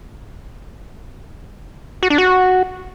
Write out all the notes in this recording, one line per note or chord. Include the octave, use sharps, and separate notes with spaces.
F#4
D4
F#4